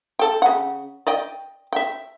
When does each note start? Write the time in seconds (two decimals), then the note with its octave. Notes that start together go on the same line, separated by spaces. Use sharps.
0.19 A4 G5
0.42 C#3 F#5
1.07 D5 D#5 G5
1.73 E5 G5